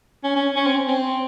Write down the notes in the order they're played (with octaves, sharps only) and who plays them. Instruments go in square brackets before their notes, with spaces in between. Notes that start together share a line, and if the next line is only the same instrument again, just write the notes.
[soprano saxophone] C#4
C#4
C#4
C4
C4